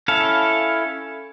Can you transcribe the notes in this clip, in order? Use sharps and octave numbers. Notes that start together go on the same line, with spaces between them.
C#4 E4 A4 F5